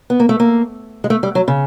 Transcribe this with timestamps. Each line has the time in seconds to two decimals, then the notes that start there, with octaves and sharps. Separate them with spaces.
0.10 B3
0.20 A#3
0.29 A3
0.40 A#3
1.04 G#3
1.10 A3
1.23 G3
1.35 F#3
1.48 C#3